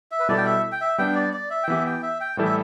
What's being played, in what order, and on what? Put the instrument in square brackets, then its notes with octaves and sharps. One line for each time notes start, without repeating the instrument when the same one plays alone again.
[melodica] E5
B4
[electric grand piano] B2 G3 E4 A4 [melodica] D5
[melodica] G5
E5
G5
E5
[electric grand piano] G3 B3 D4 [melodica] G5
[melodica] D5
D5
E5
G5
[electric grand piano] E3 B3 G4 [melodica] E5
[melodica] G5
E5
G5
[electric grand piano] A2 E3 G3 E4 A4
[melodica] E5